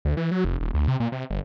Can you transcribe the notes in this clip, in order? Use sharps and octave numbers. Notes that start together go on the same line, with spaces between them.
D2
E3
F#3
F1
D#1
D2
C3
A#2
C3
G1